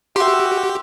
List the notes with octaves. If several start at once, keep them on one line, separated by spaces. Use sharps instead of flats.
F#4 G4 E5 C6